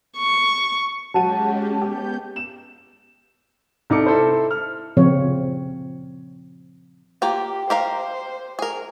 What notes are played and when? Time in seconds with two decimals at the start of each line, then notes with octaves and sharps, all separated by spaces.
0.18 C#6
1.14 F#3 G#3 C#4 F#4 G4 A5 D#7
1.81 B3 G4 G6
2.36 E7
3.90 C2 D#4 A4 D6 C#7
4.06 E4 A4 C5
4.51 F6
4.97 C#3 F3 C4 C#5
7.22 A#3 F4 G4 G5
7.70 G4 A#4 C5 F5
8.59 G#4 A#4